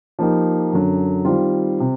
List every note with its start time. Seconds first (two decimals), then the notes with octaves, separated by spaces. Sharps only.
0.19 F3 A#3 D#4 G4
0.72 F#2 D3 F#3
1.25 D#3 G3 C4 F4
1.80 C3